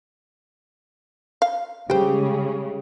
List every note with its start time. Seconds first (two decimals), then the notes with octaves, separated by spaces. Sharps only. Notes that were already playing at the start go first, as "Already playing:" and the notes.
1.42 F5
1.90 C#3 G3 G#3 G4 C5 G5